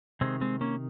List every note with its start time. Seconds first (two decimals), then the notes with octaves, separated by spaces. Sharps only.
0.21 C3 D#3 G#3 C4
0.41 G#3 C4
0.61 A#3 C#4